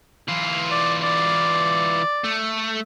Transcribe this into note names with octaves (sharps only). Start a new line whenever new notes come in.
E3 F4
D5
D5
A3